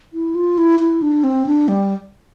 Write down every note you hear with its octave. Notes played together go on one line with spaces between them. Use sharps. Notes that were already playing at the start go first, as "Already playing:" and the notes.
E4
F4
E4
E4
D4
C4
D4
G3